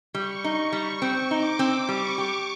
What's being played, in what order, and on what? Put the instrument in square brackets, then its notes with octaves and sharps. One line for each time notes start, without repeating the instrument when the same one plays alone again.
[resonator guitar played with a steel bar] G3 [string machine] C#6
[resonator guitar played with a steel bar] D#4
G3
C4
[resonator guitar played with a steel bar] D#4 [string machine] D6
[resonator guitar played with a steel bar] C4
[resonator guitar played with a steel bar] G3 [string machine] C#6
[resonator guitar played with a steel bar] G4